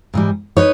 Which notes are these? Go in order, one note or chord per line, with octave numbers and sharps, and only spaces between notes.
G#2 E3 G3
D#4 B4 C#5